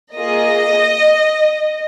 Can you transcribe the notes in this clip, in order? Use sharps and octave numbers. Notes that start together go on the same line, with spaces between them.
A#3 F4 G#4 D#5